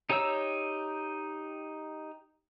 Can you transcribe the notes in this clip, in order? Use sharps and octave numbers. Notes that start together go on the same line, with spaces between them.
D#4 G4 C#5 A#5 E6